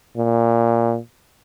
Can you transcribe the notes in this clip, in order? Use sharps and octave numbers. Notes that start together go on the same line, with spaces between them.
A#2